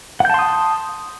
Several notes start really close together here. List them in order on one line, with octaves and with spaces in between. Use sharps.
F#5 G6 A5 C6 D#6